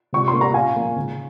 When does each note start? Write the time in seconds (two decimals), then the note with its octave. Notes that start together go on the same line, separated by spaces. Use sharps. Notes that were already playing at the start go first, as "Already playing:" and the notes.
0.13 C3 C#6
0.28 C6
0.33 G3 A#3 C#4
0.41 A#5
0.54 A#2 F5 G#5
0.75 F3 A#3
0.96 C#3